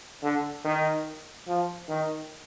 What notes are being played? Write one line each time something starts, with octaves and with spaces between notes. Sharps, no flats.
D3
D#3
F3
D#3